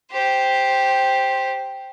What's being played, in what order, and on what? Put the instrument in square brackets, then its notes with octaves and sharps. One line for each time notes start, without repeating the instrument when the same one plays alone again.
[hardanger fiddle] G4 C5